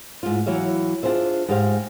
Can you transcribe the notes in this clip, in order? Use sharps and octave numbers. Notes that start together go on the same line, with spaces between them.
G#2 F4
E3 F#3 E4 C#5 E5 F5
D4 F4 G4 G#4 C5 E5
G#2 G#3 G4 C5 F5